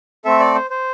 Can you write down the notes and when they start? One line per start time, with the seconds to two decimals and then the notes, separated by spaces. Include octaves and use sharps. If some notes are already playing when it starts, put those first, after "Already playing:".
0.25 A3 C4 A4 E5
0.40 D5
0.55 C5
0.70 C5